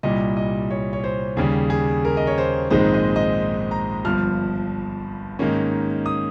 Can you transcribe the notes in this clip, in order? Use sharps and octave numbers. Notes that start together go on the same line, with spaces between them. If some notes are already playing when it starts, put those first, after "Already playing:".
C2 A#2 G3 D#5
D#5
C#5
C#5
C5
D#2 C#3 G3 G#4
G#4
A#4
D#5
C#5
C5
A#1 G#2 D#3 G#3 C4 C5
D#5
D#5
A#5
G1 G2 F3 F6
G#2 D#3 A#3 C#4
D#6